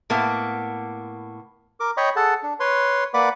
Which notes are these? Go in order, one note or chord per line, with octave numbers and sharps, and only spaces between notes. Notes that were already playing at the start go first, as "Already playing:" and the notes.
A2 A#3 B3
A#4 D6
C#5 D#5 G5 B5 C#6
G#4 A4 F#5 A5
D4
B4 C#5 C6
A#3 B4 D5 F#5 B5 D6